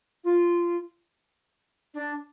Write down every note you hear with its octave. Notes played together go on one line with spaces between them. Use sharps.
F4
D4